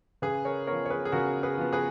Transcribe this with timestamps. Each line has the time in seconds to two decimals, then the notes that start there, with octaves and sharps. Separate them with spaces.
0.22 C#3 G#4 B4
0.45 A#4 C#5
0.67 F3 B3 A#4 C#5
0.86 C#5
0.90 G#4 B4
1.05 G#4
1.12 C#3 F#4 A#4
1.43 G#4 B4
1.58 F3 B3
1.73 G#4 B4